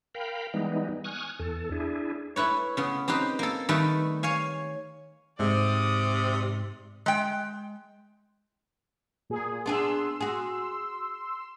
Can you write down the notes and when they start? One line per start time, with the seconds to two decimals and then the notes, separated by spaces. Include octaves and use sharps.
0.15 A#4 F5 G5 B5
0.54 E3 G3 G#3 B3 D#4
1.04 G#5 C#6 D#6 F6 F#6
1.39 E2 A4
1.72 D4 E4 G#4
2.36 A3 E4 B4 C#5
2.77 C#3 B3
3.08 C4 D#4 G4 B4 C5
3.39 A#3 A4
3.69 D#3 G3 A3 A4 B4
4.23 C#5 F5 G#5
5.40 G#2 C3 D5 D#6
7.06 G#3 G5
9.30 A#2 G#4
9.66 B3 D4 G#4 C6 E6
10.21 F#4 G#4